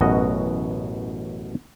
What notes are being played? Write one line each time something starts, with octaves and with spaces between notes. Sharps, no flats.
A1 F#2 B2 F#4 D#5